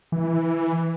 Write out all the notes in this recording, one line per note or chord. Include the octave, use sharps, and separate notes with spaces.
E3